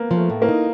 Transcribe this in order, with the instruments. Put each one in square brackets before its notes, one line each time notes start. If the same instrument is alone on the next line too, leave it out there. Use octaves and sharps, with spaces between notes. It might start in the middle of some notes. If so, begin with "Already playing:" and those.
Already playing: [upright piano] A#3 B3
[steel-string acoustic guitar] F3
[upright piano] A3
[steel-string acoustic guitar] A2
[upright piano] A#3
[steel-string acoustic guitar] D#4